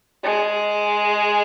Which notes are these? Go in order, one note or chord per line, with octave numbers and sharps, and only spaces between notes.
G#3